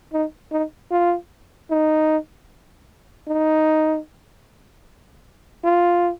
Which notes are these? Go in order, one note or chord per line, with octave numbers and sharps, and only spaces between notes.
D#4
D#4
F4
D#4
D#4
F4